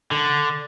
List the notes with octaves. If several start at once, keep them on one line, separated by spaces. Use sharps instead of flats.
D3